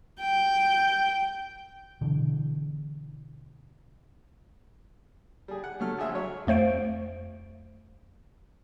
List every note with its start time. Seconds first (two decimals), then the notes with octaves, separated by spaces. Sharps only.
0.21 G5
2.01 B2 D3 E3
5.48 G3 G#4
5.64 F#5
5.80 F#3 A3 F6
5.98 A#1 G#4 E5
6.15 F#3 C#5
6.47 F2 A3 C5 F5 D7